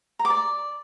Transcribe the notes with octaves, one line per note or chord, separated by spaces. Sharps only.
A#5
D6
D5